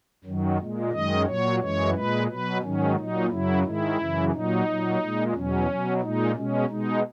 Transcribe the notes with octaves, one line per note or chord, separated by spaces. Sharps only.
F#2 D#3 F#3
A#2 G#3
F#2 D#3 G#3 D#5
A#2 F#3 C#5
F#2 E3 G#3 C#5
A#2 G#3 B4
B2 F#3 B4
G#2 D#3 F#3 C#4
A#2 F#3 D#4
F#2 C#3 F#3 E4
G#2 D#3 G#3 E4
F#2 C#3 E3
A#2 F#3 D#4
A#2 F#3
A#2 G#3
E2 B2 F#3 C#4
B2 F#3
A#2 G#3 D#4
B2 G#3 C#4
B2 G#3 D#4